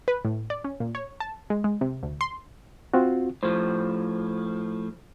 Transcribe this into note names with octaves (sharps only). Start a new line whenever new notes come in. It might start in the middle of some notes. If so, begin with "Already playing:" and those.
B4
A2
D5
C#4
A#2
C#5
A5
G#3
G#3
C3
D2
C6
C4 F4 F#4
A2 F3 C5